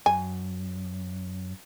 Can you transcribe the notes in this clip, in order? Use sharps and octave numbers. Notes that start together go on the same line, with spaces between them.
F#2 G#5